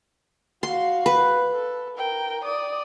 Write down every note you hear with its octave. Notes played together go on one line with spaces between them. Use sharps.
F#4 F5 C6
B4
A4
A#4 G5
D5 D#6